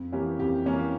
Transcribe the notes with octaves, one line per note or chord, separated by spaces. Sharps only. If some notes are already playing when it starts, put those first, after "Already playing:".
Already playing: F2
E3 A#3 C#4 G4
F2 G4
E3 A#3 C#4